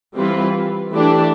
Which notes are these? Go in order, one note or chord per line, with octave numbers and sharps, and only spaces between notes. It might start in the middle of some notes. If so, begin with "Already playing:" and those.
E3 G3 C4 F4 B4
E3 A3 D4 G4